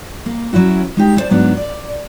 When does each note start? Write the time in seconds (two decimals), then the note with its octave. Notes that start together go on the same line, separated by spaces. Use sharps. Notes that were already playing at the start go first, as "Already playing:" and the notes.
0.26 A#3
0.53 F#3 C#4 E4 F#4
0.97 G#3 D#4 G4
1.17 E4 C5 D5 A5
1.29 G#2 F#3 B3 D4
1.57 D5